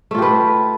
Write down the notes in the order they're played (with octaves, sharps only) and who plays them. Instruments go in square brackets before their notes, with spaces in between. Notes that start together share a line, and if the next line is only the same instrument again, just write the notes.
[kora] A3
F4
G4
B4